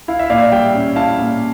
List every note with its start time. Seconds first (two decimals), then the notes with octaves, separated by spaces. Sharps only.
0.08 E4 F5
0.19 E5
0.30 A#2 D5 F5
0.52 G3 E5 G5
0.74 C#4
0.96 E4 F5 A5
1.18 A#2